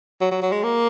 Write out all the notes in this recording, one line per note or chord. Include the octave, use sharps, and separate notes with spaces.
F#3
F#3
F#3
G#3
A#3